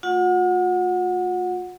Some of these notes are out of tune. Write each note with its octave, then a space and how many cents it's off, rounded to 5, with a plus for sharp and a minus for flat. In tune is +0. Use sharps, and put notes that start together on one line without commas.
A3 +0 F4 +40 F#5 -15